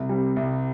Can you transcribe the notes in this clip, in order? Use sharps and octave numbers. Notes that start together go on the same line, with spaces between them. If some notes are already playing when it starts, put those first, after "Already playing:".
Already playing: C2
C3 G3
C2